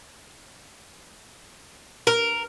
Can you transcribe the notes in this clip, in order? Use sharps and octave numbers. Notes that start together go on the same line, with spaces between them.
A#4